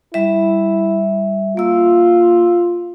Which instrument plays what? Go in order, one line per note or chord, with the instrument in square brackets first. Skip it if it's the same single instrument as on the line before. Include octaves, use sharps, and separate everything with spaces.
[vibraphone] G3 E5 [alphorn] E4
[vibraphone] A#3 E6 [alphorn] F4